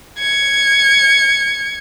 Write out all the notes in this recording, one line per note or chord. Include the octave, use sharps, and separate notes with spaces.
G#6 C#7